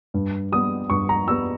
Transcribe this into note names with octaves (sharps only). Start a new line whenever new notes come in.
G2
G3 B3 D#6
G2 C#6
A#5
G3 B3 E6